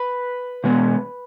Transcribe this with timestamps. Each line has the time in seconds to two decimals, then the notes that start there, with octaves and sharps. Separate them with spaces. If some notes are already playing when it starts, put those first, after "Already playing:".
Already playing: B4
0.64 B2 G#3 B3